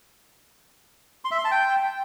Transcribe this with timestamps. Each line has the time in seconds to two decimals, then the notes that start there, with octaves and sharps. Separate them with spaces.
1.25 C6
1.31 E5
1.38 C6
1.45 A5
1.51 G5